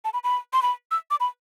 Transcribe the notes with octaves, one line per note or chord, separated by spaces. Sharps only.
A5
B5
B5
C6
B5
E6
D6
B5